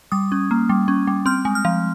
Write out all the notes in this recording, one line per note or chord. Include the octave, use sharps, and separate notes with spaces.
G3 D#6
C#4
A#3
G3
C#4
G3
C4 F6
G#3
F6
F3